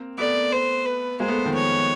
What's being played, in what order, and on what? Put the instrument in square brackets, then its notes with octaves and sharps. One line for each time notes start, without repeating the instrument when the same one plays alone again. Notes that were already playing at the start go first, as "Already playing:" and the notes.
Already playing: [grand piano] A#3 C4
[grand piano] A3 B3 [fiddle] D5
[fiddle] C5
B4
[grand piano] G#3 A#3 [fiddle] C5
[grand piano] A3 B3
D#3 F3
[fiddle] C#5